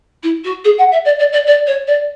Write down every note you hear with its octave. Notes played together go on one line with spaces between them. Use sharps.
E4
F#4
G#4
F#5
E5
D5
D5
D5
D5
C#5
D5